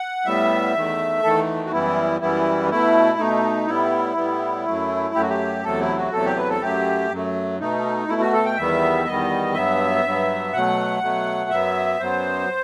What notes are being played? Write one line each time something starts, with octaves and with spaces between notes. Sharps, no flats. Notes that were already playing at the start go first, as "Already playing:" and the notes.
Already playing: F#5
A2 G3 B3 E5
E2 D#3 A3
E2 D#3 A3 A4
F#4
F#2 E3 G3 B3 E4
F#2 E3 G3 B3 E4
B2 A3 E4
B2 A3 D#4
A2 G3 B3 E4
A2 G3 B3
F#2 F#3 A3
F#2 F#3 A3 G4
F#4
G4
E2 C3 F#3 A3 A4
E4
F#4
E2 C3 F#3 A3 A4
G4
B4
A4
F#2 F#3 A3 G4
F#2 F#3 A3
B2 A3 D#4
B2 A3 E4
F#4
A4
G5
E2 D#3 G3 B3 E5
E2 D#3 G3 B3 D#5
G2 F#3 B3 E5
G2 F#3 B3
B2 F#3 A3 F#5
B2 F#3 A3
F#2 F#3 B3 E5
F#2 F#3 B3 C5